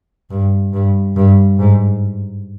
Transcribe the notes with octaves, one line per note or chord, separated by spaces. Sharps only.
G2
G2
G2
G#2